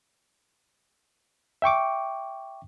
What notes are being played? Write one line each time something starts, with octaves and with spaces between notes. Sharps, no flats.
E5 G5 C#6 D6